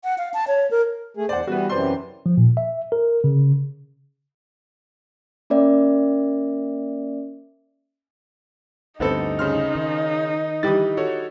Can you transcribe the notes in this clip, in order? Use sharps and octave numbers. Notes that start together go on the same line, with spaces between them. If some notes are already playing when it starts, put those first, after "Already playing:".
F#5
F5
A5
C#5
A#4
A3 G#4
E2 C5 D5 F#5
E3 G3 B3 F#4 B4
F#2 C3 E3 C5 D5 C6
F3
A#2
E5
A#4
C#3
A#3 C#4 A#4 D5 E5
D2 G2 B3 C4 D#4 A4
C#3 C6 F6
D#3
E3 G3 G4 D#6 A6
F#4 A4 C#5